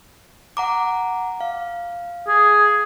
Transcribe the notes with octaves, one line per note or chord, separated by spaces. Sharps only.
F#5 A#5 D6
F5
G#4